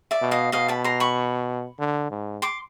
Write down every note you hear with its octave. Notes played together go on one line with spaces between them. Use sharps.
D5 E5
B2
D#5 F5
B2 D#5 F5
A5 B5
A#5 C6
B5 C#6
D3
G#2
C6 D6